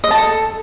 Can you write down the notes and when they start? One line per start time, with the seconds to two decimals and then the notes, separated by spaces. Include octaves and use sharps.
0.04 D#5
0.11 A5
0.18 A4